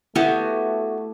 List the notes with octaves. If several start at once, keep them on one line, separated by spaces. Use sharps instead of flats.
A3 B3 E4 F#4 G4 A4 E5